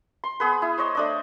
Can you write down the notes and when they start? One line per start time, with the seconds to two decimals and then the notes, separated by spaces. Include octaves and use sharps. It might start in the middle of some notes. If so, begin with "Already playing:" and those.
0.24 C6
0.40 B3 G#4 B4
0.62 E4
0.78 C5 C#5 D#5
0.95 A3 D4 D#5